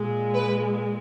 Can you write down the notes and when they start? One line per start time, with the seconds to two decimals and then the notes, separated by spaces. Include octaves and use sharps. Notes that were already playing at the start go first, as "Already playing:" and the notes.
Already playing: A#2 G#3
0.34 B4